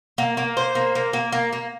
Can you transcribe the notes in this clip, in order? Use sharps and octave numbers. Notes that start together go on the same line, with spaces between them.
A#3
A#3
C5
A#3
A#3
A#3
A#3
A#3